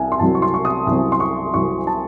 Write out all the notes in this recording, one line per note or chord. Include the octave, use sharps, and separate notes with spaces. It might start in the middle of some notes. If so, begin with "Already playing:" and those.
Already playing: C2 G#5
C6
C2 C3 F#3 C4 A5
C#6
C6
C#6
D#6
C2 C3 F#3 C4 D#6
C6
C#6
C2 C3 F#3 C4 C#6
A5